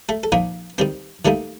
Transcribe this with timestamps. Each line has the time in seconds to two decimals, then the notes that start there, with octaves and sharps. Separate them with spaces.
0.09 A3 A4
0.23 A4
0.32 A#2 F3 A#3 D#4 A#4
0.78 D#3 G3 C4 C5
1.25 D#3 G3 A3 A#3 D#4 A4